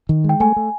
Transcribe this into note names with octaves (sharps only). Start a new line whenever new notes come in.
D#3
G#3
G5
A3 G#5
A3